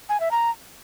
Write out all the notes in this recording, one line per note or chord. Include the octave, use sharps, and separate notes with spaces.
G#5
E5
A#5